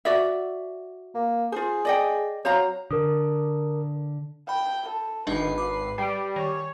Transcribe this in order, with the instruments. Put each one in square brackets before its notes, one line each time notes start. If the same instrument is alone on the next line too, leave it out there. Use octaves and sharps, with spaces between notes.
[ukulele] F#4 D5 E5
[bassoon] A#3
[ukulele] F4 C5 [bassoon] G#4
[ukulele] D5 D#5 G5
[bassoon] F#3 [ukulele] C5 F5 A#5
[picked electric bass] D3 [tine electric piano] A#4 D#6
[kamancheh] G5 [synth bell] B5
[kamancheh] A4
[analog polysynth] G#1 C7 [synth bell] D4 D#4 D#5 [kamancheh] B4
[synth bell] D6
[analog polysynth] G3 [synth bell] C7 D7
[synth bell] D#3 [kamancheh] C#5